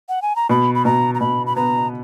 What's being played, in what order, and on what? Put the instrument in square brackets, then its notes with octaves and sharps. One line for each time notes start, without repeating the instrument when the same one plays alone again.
[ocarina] F#5
G#5
A#5
[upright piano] B2 [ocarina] B5
[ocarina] B5
[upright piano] B2 [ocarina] A#5
[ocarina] A#5
[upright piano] B2 [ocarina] B5
[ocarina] B5
[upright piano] B3 [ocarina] A#5